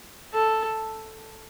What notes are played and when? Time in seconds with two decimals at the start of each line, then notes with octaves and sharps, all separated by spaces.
0.33 A4